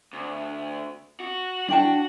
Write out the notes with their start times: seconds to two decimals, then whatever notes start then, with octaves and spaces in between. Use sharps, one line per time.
0.13 D2
1.20 F#4
1.69 D4 F#4 G5 A5